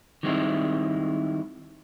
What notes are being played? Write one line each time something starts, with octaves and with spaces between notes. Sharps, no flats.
D#3 G3 G#3 C4 D#4 E4